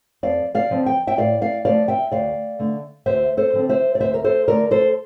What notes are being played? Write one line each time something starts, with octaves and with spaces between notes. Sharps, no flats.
F2 D5 F5
D5 F5
D3 F3 C4
G5
E5 G5
A2 D5 F5
D5 F5
F3 A3 D5 F5
E5 G5
D2 D5 F5
D3 A3
D2 C5 E5
A4 C5
D3 F3 C4
C5 E5
D5
D2 C5 E5
A#4
A4 C5
D3 A3 A#4 D5
A4 C5